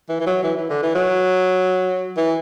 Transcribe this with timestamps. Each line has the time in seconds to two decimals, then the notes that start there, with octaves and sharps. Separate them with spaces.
0.09 E3
0.20 E3
0.27 F#3
0.44 E3
0.57 E3
0.70 D3
0.83 E3
0.95 F#3
2.17 E3